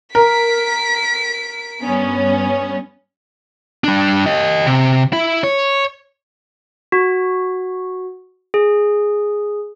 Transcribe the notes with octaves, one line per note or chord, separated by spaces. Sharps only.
A#4 B6 D7
G2 B3 C#4
G3 D4
G4 D#5
C3
E4
C#5
F#4
G#4